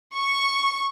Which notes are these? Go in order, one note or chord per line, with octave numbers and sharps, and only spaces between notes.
C#6